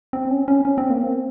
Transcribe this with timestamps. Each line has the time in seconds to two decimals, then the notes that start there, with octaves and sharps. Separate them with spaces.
0.13 C4
0.30 C#4
0.48 C#4
0.65 C#4
0.78 C4
0.90 A#3
1.04 C4